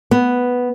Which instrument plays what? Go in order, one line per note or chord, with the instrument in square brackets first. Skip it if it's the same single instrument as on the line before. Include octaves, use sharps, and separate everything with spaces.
[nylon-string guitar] B3